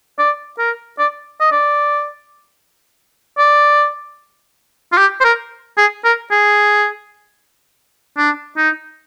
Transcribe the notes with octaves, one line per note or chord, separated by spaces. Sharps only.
D5
A#4
D5
D#5
D5
D5
F4
G4
C5
A#4
G#4
A#4
G#4
D4
D#4